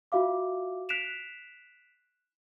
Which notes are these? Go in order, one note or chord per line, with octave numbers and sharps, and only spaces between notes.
F4 F#4 E5 F5 D6
F#6 B6 C7 D7 E7 F7